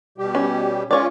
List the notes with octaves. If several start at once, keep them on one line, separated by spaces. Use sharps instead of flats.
B2 G3 G4
C#4
G#3 C#4 F4 C#5 D5